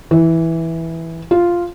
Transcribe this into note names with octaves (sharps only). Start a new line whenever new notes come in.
E3
F4